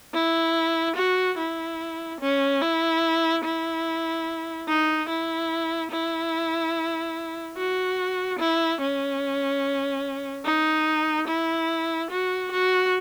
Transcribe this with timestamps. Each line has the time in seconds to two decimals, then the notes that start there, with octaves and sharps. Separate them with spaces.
0.14 E4
0.96 F#4
1.38 E4
2.21 C#4
2.61 E4
3.44 E4
4.68 D#4
5.09 E4
5.91 E4
7.57 F#4
8.39 E4
8.81 C#4
10.45 D#4
11.28 E4
12.11 F#4
12.51 F#4